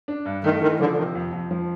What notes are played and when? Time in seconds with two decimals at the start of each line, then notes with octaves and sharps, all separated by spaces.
0.08 D4
0.26 G2
0.44 D#3 A3
0.61 D#3 E3
0.79 D3 F3
0.97 C3 D#3
1.15 F2
1.33 F2
1.51 F3